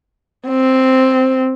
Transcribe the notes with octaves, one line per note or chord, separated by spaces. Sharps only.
C4